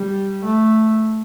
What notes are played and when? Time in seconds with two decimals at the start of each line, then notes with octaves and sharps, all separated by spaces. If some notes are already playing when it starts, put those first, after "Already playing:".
Already playing: G3
0.44 A3